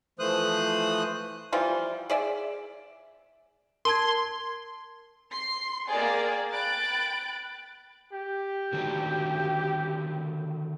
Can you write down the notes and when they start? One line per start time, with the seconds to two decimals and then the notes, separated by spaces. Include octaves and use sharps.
0.19 E3 F3 A3 C5 D#6 F#6
1.52 E3 F3 G3 F4
2.10 G#4 D5 E5
3.85 A#4 A5 C6 G#6
5.31 C6 C7
5.89 A#3 G#4 A#4 D5 G5
6.53 G5 B5 F#6 A6 D7
8.13 G4
8.73 D3 D#3 F#4